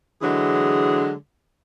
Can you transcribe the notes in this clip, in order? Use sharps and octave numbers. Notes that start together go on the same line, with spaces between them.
D3 E3 F#3 G#3 G#4